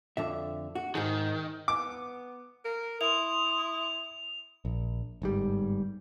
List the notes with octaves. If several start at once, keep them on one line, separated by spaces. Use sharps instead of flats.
F2 D3 E5
F#4
G#2 D#3 G#4
B3 D6
A#4
E4 C6 D#6 F7
A#1
G1 G#2 G3